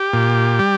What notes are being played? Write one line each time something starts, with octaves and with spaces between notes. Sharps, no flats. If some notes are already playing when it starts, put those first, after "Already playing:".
Already playing: G4
A#2
G3